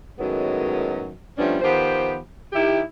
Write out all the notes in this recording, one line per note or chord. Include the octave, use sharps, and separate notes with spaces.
F#2 A2 D#3 F#3 G#3 B3
F3 G3 A3 B3 C#4 D4
D#3 F3 B3 G4 C5
D#3 E4 G4